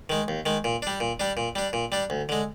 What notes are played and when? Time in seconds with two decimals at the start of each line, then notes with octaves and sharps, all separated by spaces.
0.09 D#3 G#3
0.28 D#2
0.46 D#3 G#3
0.64 A#2
0.82 G3 D4
1.00 A#2
1.20 G3 D4
1.37 A#2
1.55 G3 D4
1.73 A#2
1.92 G3 D4
2.10 D2
2.29 D3 G#3